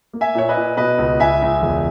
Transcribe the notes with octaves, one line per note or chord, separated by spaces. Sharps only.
A#3
E5 G#5
A#2 C#5
B4 D#5
A#2
B2 B4 D#5
C#2
C#2 E5 G#5
C#2
E1